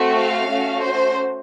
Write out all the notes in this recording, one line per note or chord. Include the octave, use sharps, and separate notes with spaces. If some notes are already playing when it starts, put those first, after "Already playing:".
Already playing: A3 C4 F#4
F5
A3 C#4 F#4
C5